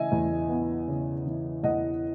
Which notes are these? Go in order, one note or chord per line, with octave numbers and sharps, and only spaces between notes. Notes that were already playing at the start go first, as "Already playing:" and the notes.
Already playing: C#3 E3 D#5 E5 G#5
E2
B3
C#3
E3
E2 D#5 F#5